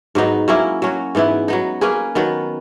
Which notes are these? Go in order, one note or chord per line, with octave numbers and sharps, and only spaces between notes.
G#2 F#3 B3 D#4
F#3 A#3 C#4 E4
F#3 C#4 F#4
G#2 E3 B3 E4
F#3 B3 D#4
A#3 C#4 G#4 B4
D#3 F#3 B3